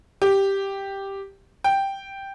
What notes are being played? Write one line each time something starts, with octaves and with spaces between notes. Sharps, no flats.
G4
G5